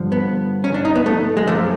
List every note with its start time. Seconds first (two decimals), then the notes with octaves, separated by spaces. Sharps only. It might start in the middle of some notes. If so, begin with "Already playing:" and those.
Already playing: G2 D3 F3
0.12 B3
0.64 C#4
0.74 D4
0.85 D#4
0.95 B3
1.06 A3
1.37 G#3
1.47 F#2 D3 F3 A3